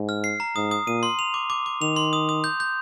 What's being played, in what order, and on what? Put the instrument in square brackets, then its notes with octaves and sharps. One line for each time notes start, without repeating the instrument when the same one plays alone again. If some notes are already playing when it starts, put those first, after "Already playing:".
Already playing: [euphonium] G#2
[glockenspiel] F6
C7
A#5
[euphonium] G#2 [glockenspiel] D#6
[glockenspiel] D#6
[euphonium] A#2 [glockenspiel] D#7
[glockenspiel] C6
F7
D6
D6
D6
[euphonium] D#3 [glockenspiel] F7
[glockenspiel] C6
D#6
D#6
G6
G6